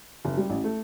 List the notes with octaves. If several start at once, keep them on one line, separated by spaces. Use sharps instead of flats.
F#1
G3
A1
A3